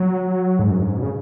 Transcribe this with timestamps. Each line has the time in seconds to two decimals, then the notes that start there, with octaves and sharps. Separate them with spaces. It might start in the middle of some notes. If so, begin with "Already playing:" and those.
Already playing: F#3
0.59 G#2
0.70 F#2
0.82 G#2
0.96 B2
1.02 C#3